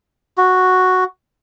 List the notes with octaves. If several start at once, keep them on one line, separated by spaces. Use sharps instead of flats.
F#4